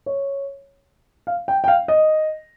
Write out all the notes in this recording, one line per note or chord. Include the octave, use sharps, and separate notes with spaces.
C#5
F5
G5
G5
F5
D#5